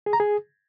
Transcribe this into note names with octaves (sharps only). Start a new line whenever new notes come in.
G#4
A#5
G#4